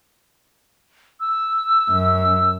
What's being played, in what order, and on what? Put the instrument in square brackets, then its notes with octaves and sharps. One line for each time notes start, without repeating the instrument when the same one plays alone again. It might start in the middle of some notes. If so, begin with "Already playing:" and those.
[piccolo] E6
[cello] F#2